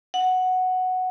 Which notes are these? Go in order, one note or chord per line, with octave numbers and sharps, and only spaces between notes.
F#5